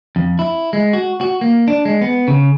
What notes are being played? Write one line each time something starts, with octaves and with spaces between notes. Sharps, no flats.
F2
E4
G#3
F#4
F#4
A#3
D4
G#3
B3
C#3